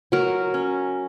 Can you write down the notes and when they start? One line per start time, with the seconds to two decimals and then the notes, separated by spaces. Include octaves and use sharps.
0.12 F#3 F#4 A#4
0.54 C#4